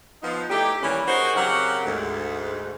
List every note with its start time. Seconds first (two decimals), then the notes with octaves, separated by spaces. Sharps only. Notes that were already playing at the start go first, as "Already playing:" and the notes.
0.23 F3 B3 D#4
0.50 A3 D#4 E4 G4
0.82 D#2 E3 G3 C#4
1.08 D#4 F#4 G#4 A#4 C5
1.36 C#3 F#3 C4 G4 A#4 F#5
1.85 D2 G#2 A3